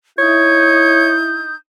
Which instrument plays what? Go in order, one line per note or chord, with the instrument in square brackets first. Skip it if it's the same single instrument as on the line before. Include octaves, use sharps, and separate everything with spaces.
[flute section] D#4 D#6 G6 [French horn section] E4 [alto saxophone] C#5